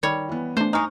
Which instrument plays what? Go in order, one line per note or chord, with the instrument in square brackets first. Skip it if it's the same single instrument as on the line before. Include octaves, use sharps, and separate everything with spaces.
[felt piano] D#3 [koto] G3 C#5
[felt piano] E3 B3
[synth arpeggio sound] A3 D4 [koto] C5
[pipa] G#3 D#4 [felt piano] C#6 F6